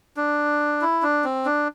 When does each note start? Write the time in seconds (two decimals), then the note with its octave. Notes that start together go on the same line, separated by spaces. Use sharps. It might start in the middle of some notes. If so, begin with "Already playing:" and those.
0.17 D4
0.82 E4
1.03 D4
1.24 C4
1.45 D4